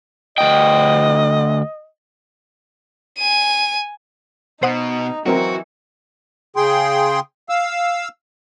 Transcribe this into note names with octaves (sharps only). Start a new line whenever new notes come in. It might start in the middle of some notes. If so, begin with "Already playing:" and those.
D2 D#5 G5
G#5 D#7
B2 D#4 C5 F#5 D#6
E3 F#3 C4 F#4 A#4
C#3 G#4 G5 C6
F5 E6